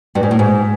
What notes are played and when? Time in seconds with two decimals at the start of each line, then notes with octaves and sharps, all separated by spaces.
0.15 G2
0.23 G#2
0.31 A2
0.39 G#2